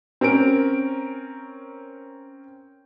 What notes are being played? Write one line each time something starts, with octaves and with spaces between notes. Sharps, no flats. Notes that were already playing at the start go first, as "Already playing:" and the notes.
C4 C#4 A#4 D7